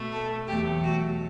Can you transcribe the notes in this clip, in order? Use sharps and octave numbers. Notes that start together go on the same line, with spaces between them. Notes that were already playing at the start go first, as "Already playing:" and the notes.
Already playing: B2 A3
A4
E2 B2 F#3 A3 G4
F#4